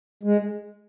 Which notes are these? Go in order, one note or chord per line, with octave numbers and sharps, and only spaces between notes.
G#3